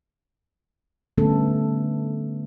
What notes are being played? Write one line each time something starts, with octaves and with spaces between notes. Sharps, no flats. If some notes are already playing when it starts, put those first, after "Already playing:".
D3 G3 A3 B3 C#4 A4